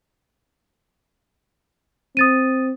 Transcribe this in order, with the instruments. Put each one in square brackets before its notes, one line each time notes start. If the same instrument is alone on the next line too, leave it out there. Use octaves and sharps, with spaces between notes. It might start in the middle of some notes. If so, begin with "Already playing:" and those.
[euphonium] C4 [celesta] D#6 A6 D#7